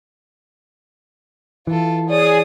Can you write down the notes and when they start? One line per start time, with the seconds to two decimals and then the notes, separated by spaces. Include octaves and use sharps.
1.67 E3 F4 A4
2.09 G#4 C#5 D5 D#6